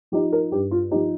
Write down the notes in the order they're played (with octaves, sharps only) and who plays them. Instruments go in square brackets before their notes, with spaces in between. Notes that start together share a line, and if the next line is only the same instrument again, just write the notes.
[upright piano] F3 D#4 G4
A#4
G2 G4
F4
F3 D#4 G4